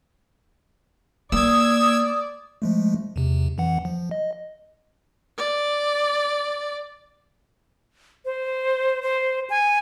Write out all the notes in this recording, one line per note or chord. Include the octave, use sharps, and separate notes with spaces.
A#3 D5 D#6 E6 G#6
F3 G#3 A3
E2 C3
F2 E3 F#5
F3
D#5
D5
C5
C5
G#5